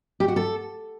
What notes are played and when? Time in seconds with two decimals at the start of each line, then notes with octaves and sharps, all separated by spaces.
0.20 G4
0.28 F#4
0.36 A4